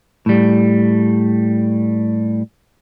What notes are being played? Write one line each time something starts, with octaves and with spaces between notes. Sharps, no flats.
A2 G3